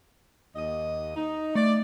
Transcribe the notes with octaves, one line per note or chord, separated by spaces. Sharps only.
D#2 D#5
D#4
A3 D5